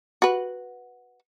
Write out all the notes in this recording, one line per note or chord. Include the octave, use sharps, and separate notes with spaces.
F#4 B4